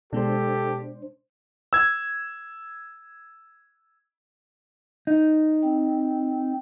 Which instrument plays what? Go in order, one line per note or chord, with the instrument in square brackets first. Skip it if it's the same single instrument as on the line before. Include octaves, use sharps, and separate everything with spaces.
[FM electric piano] B2 G#3 [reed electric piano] D4 C5 [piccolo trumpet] G4 [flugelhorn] A4
[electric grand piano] E6 G#6
[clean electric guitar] D#4
[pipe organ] C4